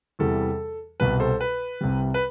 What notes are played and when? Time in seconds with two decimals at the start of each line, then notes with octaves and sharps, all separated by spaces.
0.19 E2 C3 E3 G3 A4
1.00 C2 B2 G3 B4
1.20 A4 C5
1.41 B4
1.81 C2 C3 G3
2.14 B4